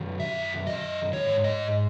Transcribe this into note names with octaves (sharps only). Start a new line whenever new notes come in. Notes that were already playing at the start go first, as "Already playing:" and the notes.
Already playing: F#2 D#3 F#3
E5
D#5
G#2 E3 C#5
D#5